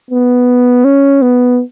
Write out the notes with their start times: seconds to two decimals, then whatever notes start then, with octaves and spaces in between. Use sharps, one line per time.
0.10 B3
0.84 C#4
1.22 B3